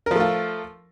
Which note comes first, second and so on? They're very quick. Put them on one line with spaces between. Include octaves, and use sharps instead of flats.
A#4 F3 A3 F4